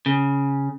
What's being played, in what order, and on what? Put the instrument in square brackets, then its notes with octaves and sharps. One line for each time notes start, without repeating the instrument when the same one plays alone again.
[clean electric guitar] C#3